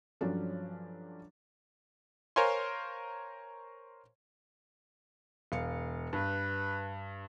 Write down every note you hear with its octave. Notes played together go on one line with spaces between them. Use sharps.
G2 F3 F#3 C#4 D4 A4
A#4 C5 C#5 F5 G#5 C6
E1 F5 C#7
G2 B4